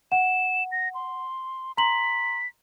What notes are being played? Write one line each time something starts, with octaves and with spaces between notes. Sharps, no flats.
F#5 E7
A#6
C6
A#5 C6 B6 F#7